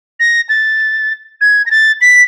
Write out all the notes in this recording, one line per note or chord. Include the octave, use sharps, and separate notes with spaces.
A#6
A6
G#6
A#6
A6
B6